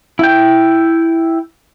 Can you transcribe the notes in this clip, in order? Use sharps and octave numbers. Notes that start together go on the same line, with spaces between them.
E4 G5